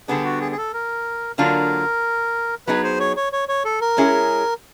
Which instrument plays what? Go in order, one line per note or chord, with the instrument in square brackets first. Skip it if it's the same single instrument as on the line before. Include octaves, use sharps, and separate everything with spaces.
[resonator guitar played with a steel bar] D3 G3 B3 D4 [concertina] G#4
[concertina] F#4
G#4
G#4
A4
A#4
[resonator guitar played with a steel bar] D3 F#3 A#3 D4 F4 [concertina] A#4
[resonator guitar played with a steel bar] F#3 B3 D#4 G#4 [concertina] B4
[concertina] C5
C#5
C#5
C#5
C#5
A4
A#4
[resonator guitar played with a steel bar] G#3 C#4 E4 G#4